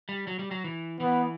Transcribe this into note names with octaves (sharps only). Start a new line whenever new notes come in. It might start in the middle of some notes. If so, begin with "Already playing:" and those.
G3
F#3
G3
F#3
E3
E3 B3